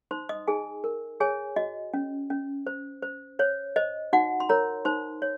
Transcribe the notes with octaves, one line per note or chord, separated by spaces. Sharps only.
D#4 C5 C6
D#5 D#6
D#4 G#4 G#5
A#4
G#4 C#5 G#5
F#4 D#5
C#4
C#4
C5
C5
C5 C#5
C5 D#5
D#4 F#4 F#5
C6
A#4 C#5 A#5
D#4 C5 C6
C#5